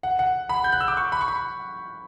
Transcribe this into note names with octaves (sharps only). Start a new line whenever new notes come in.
F#5
F#5
B5
G6
F#6
E6
D6
C#6
B5
C#6
B5